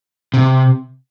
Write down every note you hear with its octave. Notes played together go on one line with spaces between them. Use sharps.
C3